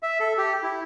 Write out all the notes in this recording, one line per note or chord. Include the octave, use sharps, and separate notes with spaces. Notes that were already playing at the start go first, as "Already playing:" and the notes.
E5
A4
G4
E4